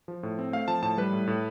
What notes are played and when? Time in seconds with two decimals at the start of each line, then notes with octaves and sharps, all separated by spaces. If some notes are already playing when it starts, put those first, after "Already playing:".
0.08 F3
0.23 A2
0.39 C4
0.53 A3 F5
0.68 F3 A5
0.82 A2 A5
0.98 G3 B4
1.13 A2
1.27 A2